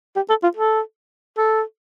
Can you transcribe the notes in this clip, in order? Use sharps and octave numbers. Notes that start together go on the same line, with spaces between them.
G4
A4
F4
A4
A4